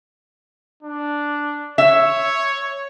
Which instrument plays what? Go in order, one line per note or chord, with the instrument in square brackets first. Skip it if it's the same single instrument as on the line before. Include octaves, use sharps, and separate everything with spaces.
[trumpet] D4
[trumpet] C#5 [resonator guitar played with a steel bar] E5